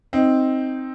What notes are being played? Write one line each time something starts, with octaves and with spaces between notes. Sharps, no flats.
C4 D#4